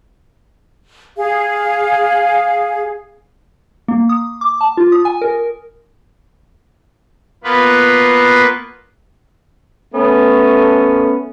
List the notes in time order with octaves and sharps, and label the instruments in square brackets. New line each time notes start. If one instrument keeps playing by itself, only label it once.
[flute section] G#4 F5
[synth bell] A#3
D#6
D6
A5
F4
D#6
G#5
A#4
[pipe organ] A#3 B3 F4 B4
[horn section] A3 B3 C#4